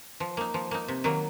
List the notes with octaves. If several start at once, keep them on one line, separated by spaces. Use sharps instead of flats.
F3
A#3 D#4
F3
A#3 D#4
C3
D#3 F#3 A#3